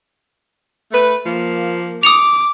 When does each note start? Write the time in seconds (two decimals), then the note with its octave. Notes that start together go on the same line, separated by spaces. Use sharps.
0.92 A3 B4
1.24 F3 A#3
2.03 D6 D#6 C#7 F7